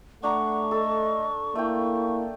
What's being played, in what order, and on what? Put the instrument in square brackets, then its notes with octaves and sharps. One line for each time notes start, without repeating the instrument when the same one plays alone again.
[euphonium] A3 [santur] D4 A#5 [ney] F#5 [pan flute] C#6
[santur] A4 [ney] D#5
[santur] A3 G5 [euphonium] A#3 [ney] E4